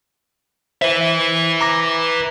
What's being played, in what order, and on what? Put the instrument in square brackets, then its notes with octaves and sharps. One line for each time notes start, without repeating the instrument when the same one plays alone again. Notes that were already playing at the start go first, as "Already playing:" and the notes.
[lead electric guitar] B4 E5 [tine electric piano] C5
[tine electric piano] A#5 D6 A#6